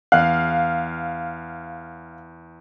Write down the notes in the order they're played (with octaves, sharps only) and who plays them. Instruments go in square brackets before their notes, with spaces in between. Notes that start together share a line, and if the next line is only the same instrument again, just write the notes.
[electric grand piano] E2 F#6 [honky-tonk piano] F5